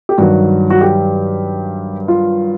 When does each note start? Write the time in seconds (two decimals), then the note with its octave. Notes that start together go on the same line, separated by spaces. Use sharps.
0.09 G4
0.18 G2 D#3 F#3 F#4
0.70 F#4
0.81 G4
2.08 F4